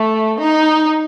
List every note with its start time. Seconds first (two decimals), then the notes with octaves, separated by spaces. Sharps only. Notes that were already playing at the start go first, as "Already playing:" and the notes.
Already playing: A3
0.39 D#4